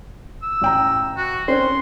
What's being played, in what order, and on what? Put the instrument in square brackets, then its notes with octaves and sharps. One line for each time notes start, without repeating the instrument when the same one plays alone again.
[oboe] E6
[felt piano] A1 G5 A#5
[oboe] F#4
[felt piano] C4 C#4 [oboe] C6